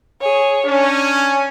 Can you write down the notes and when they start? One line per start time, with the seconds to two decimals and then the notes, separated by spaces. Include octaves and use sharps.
0.22 G#4 C#5
0.66 C#4 D4